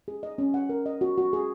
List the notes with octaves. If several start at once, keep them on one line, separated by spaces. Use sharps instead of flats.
G#4
D#5
C#4
F#5
A#4
D#5
F#4
F#4
G#4